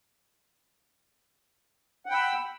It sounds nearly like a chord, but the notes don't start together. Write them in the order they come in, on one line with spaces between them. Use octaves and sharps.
F#5 G5 B5 E6